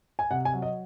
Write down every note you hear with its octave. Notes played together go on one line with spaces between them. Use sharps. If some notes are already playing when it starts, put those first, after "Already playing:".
G#5
C3 F#5
G#5
F#3
D#5